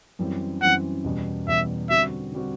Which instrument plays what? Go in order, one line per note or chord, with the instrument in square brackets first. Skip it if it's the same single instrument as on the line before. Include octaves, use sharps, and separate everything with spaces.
[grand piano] F#2 E3 G3 C4
[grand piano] F#2 E3 G3 C4 [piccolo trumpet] F#5
[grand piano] E2 B2 G3
[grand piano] E2 B2 G3 [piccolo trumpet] E5
[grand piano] D3 G3 C4 F#4 [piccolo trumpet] E5
[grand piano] D3 G3 C4 F#4